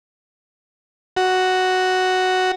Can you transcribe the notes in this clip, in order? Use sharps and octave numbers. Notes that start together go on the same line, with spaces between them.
F#4